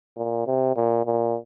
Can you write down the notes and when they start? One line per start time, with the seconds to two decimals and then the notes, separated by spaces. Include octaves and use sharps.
0.17 A#2
0.47 C3
0.76 A#2
1.06 A#2